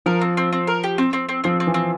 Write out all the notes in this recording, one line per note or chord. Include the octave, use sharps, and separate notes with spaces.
F3 A#4
C4
C4
C4
A#4
G4
C4
C4
C4
F3 C4
C4
E3
C4